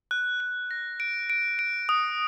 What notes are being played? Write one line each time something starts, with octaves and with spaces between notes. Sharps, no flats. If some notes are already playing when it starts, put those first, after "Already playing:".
F#6
F#6
A#6
D7
D7
D7
D#6